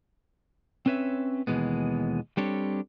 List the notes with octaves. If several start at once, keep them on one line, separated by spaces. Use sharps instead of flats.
C4 C#4 B4 C#5 E5
D#2 B2 D#3 E3 G#3 B3
G3 C4 D4 G4 A4 C#5